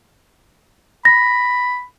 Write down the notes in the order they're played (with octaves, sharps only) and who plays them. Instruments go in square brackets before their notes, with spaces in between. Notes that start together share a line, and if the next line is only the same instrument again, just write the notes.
[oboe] B5 [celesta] A#6